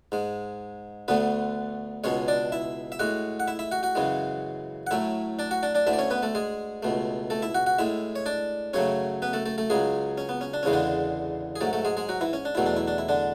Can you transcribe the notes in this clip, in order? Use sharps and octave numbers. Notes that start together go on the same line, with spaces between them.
G#2 G#3
D2 D3 A3 B3 B4
C#2 B2 G#3 C#4 C#5
D4 D5
E4 E5
E5
A2 G#3 F#4 F#5
F#5
E4 E5
E4 E5
F#4 F#5
F#4 F#5
F#2 C#3 E3 G#3
F#5
A2 F#3 A3 E4 E5
D4 D5
F#4 F#5
D4 D5
D4 D5
D2 D3 A3 E4 E5
D5
C#4 C#5
B3 B4
A3 A4
G#3 G#4
C#2 B2 A3
A3 A4
E4 E5
F#4 F#5
F#4 F#5
A2 G#3 E4 E5
C#5
D4 D5
F#2 C#3 F#3 A3 C#4 C#5
B3 B4
A3 A4
A3 A4
A3 A4
C#2 C#3 F#3 G#3 G#4
C#4
B3
C#4
D4
E2 C#3 E3 G#3 C#4
D3 D4
G#4
G#2 F#3 A3 A4
A3 A4
G#3 G#4
G#3 G#4
F#3 F#4
E3 E4
C#4
D4
E2 B2 F#3 A3 E4
D4
E4
D4
E4
D3 D4